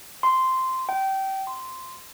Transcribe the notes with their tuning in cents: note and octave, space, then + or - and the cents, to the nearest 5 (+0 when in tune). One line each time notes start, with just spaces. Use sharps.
C6 -10
G5 -25
C6 -10